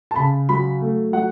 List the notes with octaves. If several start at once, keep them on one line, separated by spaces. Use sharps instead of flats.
A5
C#3 B5
F#3 B5
A3
F#3 F#5